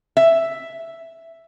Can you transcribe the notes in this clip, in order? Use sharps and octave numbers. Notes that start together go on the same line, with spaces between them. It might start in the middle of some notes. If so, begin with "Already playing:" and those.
E5